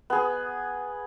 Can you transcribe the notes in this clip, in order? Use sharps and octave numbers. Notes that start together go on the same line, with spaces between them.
B3 G#4